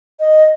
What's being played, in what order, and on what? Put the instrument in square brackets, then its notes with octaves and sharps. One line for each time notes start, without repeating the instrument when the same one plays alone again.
[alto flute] D#5